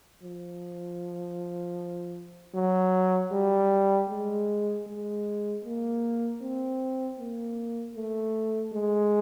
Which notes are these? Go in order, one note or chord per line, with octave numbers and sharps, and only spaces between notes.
F3
F#3
G3
G#3
G#3
A#3
C4
A#3
A3
G#3